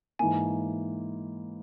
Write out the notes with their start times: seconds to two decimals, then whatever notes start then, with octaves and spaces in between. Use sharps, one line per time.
0.19 G#2 E3 A#3 G#5